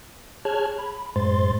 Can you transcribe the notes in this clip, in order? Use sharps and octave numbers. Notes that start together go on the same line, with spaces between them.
G#4 C#5 A5 F6 F#6 G#6
B5
F#2 A2 G#3 C5 C6 A6